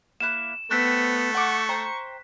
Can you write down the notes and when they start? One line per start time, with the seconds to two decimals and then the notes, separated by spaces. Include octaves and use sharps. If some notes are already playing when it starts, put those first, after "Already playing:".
0.20 A#3 E4 F#6 E7
0.71 A3 B3 C4 F#6 B6
1.35 F#5 C#6 D6
1.69 C5 G5 A#5